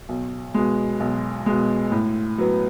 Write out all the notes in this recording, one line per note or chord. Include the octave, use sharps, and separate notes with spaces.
B1
B2 G#3
B1
B2 G#3
A2
F#3 B3